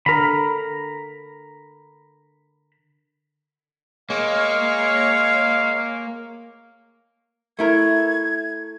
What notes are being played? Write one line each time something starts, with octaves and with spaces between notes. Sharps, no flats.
D3 A#4 A#5 B5
G#3 A#3 C#5 F5
A3 E4 A#4 G#6